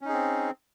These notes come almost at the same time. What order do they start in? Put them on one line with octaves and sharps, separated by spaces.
C#4 D#4 G#4 C4